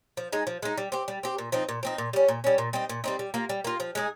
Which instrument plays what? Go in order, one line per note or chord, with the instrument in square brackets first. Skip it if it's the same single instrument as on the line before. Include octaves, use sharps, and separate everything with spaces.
[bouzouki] F3
G#3 D#4
F3
G#3 D#4
G3
C4 G4
G3
C4 G4
A#2
F3 C4 D#4
A#2
F3 C4 D#4
A#2
G3 C#4
A#2
G3 C#4
A#2
G3 C4 D#4
A#2
G3 C4 D#4
G3
A#3 F4
G3
A#3 F4
F3
G#3 D#4 G#4